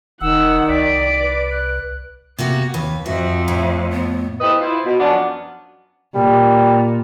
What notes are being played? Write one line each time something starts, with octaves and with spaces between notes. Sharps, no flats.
E1 D#3 F#5 E6
C2 D5 B6 D7
B4
F#6
C3 A#3 B3 F#4
D#2 B4
F2 F#4 E5
A2
B3
E4 G4 A4 B4 C5 D#5
E4 F4 C5
B2
F#2 F3 F#3 B3 C#4 D4
A#2 G3